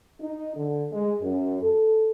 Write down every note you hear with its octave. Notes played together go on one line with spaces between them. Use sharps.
D#4
D3
G#3
F#2
A4